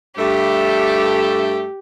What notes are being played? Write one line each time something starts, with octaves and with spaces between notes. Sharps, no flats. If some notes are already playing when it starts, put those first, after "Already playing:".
G2 A3 G4